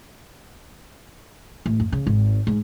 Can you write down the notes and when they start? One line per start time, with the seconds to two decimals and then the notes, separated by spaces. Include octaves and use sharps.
1.66 A1
1.80 F#2
1.92 C#3
2.07 G#1
2.47 G#2